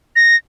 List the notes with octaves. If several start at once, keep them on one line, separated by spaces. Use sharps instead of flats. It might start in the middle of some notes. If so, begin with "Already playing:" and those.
A#6